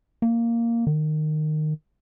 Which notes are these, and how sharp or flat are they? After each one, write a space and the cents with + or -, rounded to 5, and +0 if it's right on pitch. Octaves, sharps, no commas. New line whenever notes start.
A#3 -5
D#3 -20